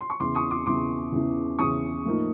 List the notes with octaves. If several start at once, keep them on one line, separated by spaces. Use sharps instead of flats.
C6
C#6
E2 C#3 E3 C6 D6
C#6 D#6
C6 D6
E2 C#3 E3 C6 D6
E2 C#3 E3
E2 C#3 E3 C#6 D#6
A2 F3 A#3 D#4